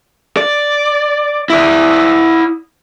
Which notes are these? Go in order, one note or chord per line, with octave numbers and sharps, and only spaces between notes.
D5
E4 D5